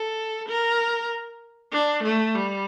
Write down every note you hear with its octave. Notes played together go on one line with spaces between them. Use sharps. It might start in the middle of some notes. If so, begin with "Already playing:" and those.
Already playing: A4
A#4
D4
A3
G3